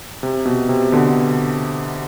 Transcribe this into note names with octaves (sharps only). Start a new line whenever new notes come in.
C3
B2
C3
B2 D3